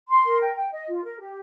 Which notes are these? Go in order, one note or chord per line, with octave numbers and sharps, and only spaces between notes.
C6
A#4
G5
G5
D#5
F4
A#4
G4